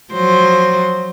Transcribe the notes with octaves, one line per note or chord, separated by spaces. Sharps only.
F3 F#3 C5